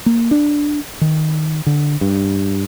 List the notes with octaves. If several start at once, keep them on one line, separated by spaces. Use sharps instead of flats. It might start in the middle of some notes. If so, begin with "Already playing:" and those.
A#3
D4
D#3
D3
G2